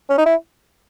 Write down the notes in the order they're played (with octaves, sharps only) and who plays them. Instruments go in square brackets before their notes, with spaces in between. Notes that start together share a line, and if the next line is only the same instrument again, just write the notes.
[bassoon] C#4
D#4
E4